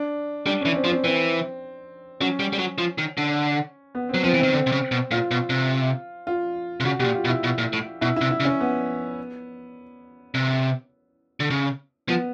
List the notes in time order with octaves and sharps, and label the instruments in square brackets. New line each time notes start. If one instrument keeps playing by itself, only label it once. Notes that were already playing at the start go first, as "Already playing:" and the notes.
Already playing: [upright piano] D4
[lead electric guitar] G3 [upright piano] D4
[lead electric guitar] E3 [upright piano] C#4
[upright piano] C4
[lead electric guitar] F3
[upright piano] C4
[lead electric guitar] E3 [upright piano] C4
[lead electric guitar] F#3 [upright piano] C#4
[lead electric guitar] G3
G3
F#3
F3
D#3
D3
[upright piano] B3
[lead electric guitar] F#3 [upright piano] C4
[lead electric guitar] F3 [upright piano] C4
[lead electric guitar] E3
[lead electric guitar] D#3 [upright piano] C4
[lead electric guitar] D3 [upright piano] C4
[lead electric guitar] C3
C#3
B2
[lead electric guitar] A#2 [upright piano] F4
[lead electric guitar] B2
C3
[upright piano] F4
[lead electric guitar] C3
[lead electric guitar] C#3 [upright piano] F#4
[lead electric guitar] B2 [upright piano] G4
[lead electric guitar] A#2
[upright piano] F4
[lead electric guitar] B2
[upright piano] E4
[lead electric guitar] B2
A#2
A2
[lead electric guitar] B2 [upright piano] E4
[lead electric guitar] C3 [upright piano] E4
[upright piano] E4
[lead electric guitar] C#3
[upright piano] C#4
B3
[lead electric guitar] C3
D3
C#3
[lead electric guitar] F3 [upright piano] B3